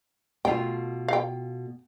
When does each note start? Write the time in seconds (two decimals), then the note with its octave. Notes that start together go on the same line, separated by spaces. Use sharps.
0.45 B2 A3 F4 G5
1.08 F5 G5